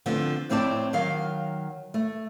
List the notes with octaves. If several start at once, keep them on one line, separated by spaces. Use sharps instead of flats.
D3 F3 A3 B3 C4
F2 A2 C4 E4 D5 A5
D#3 F#3 F5
A3